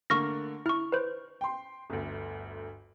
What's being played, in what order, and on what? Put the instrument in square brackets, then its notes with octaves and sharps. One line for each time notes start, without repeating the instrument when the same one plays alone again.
[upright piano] D3 A3 A#3 [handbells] C#6 F6 A#6
[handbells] E4 C#6 [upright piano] F6
[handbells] B4 C5
[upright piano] G5 C6
G1 D2